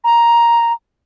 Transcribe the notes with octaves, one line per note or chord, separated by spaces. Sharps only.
A#5